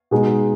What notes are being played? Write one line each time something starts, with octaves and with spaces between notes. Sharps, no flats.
B2 G#3 D#4